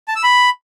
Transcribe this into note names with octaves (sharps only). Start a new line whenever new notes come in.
A5
E6
B5